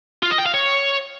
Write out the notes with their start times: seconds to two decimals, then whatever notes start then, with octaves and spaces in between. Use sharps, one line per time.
0.23 F4
0.30 D#5
0.38 G5
0.46 F5
0.54 C#5